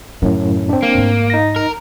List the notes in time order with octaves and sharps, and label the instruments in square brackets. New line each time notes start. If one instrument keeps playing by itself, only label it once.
[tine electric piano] F#2 A2 [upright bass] C#3
[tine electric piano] C4 D4
[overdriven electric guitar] A#3
[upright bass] G#2 A3
[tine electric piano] D#4 A#6
[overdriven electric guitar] A#4